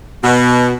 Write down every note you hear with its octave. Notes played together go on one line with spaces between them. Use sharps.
B2